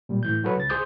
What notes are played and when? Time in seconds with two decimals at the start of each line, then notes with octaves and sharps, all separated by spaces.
0.09 A#2 G3
0.23 A2 E3 G6
0.44 F#3 F#4 A4 B4 C#5
0.56 C#2 A6
0.70 G#4 C5 C6 D6 D#6 G6